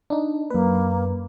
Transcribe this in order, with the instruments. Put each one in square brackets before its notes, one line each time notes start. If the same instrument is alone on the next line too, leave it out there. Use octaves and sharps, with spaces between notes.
[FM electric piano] D4 D#4
[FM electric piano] F#2 B4 [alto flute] A#3